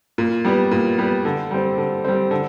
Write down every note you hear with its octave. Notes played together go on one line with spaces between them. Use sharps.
A#2
G3 B3
A#2
G3 B3
D3
G3 C4
D3
G3 C4
D3